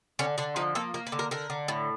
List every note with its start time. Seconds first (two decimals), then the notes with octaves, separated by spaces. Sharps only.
0.19 D3 C#4
0.38 D3 D4
0.56 F3 D#4
0.75 A#3 A4
0.94 A#3 A#4
1.07 B4
1.12 D3
1.19 A#4
1.31 D3 A#4
1.50 D3
1.68 A2